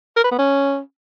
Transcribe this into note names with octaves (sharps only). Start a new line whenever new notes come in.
A#4
B4
B3
C#4